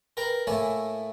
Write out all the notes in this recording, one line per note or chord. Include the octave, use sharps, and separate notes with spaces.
A#4 B4 G5 A#5
A2 A3 A#3 E4 C#5 G#5